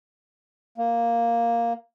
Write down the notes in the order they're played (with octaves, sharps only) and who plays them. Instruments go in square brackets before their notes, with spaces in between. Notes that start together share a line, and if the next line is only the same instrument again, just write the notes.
[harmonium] A#3